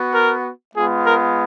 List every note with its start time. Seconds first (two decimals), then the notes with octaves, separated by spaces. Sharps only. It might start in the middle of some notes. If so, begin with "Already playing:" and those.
Already playing: B3 F#4
0.15 A#4
0.75 G#3 B3 F4 G#4
1.05 A#4